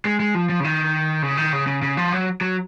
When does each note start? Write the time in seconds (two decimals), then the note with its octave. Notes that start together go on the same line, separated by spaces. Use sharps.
0.05 G#3
0.20 G#3
0.34 F3
0.49 F3
0.60 C#3
0.64 D#3
1.23 C#3
1.37 D#3
1.53 C#3
1.67 C#3
1.82 C#3
1.97 F3
2.12 F#3
2.41 F#3